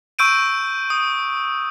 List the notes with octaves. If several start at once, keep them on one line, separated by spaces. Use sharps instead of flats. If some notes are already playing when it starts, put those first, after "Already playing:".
C#6 E6 G6 D7 D#7
D#6